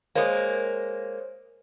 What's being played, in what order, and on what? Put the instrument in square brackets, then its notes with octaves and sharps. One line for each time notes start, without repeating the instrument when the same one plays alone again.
[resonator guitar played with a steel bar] G#3 A#3 [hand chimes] C5 C#5